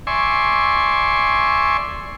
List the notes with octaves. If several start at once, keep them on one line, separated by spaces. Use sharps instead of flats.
D5 E5 G#5 C6 C#6